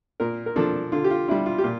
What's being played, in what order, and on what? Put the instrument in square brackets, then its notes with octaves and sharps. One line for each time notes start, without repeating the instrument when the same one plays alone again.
[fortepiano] A#2 A#4
A#4
F3 A#3 D4 A4
D3 F4
G4
F4
G3 D4 E4
F4
G4
A#2 F4